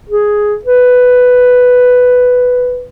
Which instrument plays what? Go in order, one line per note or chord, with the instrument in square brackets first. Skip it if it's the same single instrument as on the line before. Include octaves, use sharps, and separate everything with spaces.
[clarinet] G#4
B4